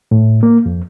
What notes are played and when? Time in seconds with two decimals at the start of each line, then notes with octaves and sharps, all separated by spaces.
0.11 A2
0.43 A#3
0.66 F2